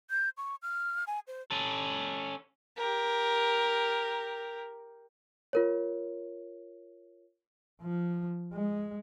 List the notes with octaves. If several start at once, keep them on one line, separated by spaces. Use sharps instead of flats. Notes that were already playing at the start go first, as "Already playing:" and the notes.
G6
C#6
F6
G#5
C5
C#4 A4
G4 A#4
F4 A#4 C#5
F3
G#3